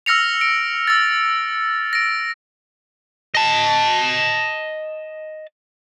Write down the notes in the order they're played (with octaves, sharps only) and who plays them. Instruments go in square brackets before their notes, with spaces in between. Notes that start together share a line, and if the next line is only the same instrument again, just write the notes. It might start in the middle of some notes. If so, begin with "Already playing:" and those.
[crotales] E6 F6 A#6 C#7 F7
D7
E6 A6
A#6 D7
[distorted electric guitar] D#5 A5